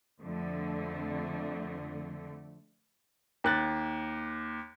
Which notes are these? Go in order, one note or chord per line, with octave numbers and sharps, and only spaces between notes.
F2 D3 A3
D#2 F#6 A6